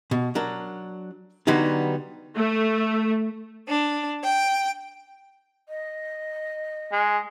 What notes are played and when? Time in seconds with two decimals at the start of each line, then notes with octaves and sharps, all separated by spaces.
0.11 B2
0.35 F#3 D4 A#4
1.47 D3 F#3 G3 B3 D#4
2.36 A3
3.68 D4
4.23 G5
5.69 D#5
6.92 G#3